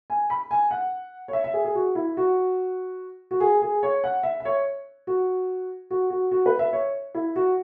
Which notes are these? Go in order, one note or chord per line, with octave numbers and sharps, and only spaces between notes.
G#5
B5
G#5
F#5
C#5
E5
E5
G#4
G#4
F#4
E4
F#4
F#4
G#4
G#4
C#5
F#5
E5
E5
C#5
F#4
F#4
F#4
F#4
B4
E5
C#5
E4
F#4